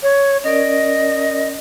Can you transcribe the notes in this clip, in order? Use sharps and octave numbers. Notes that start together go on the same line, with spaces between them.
C#5
C#4 A#4 D5 D#5